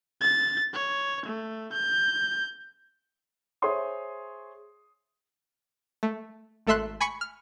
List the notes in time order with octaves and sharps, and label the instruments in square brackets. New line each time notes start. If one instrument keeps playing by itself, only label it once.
[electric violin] A6
C#5
A3
G6
[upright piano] G#4 C5 C#5 E5 C6 D#6
[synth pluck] A3
G#1 A3 A4 E5 C6 F#6
G#5 B5 C#6 B6 C#7
F6